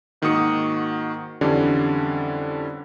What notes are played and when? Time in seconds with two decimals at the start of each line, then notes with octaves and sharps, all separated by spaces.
0.22 G#2 D#3 A#3 F#4 D#6 C#7
1.41 F2 D3 E3 G3 C#4 D4